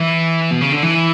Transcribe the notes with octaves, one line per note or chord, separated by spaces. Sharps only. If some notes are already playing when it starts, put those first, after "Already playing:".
Already playing: E3
B2
C#3
D3
E3